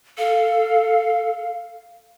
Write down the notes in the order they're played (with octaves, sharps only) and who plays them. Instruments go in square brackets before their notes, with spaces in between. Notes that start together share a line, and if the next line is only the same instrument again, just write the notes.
[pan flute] A4 [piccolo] F5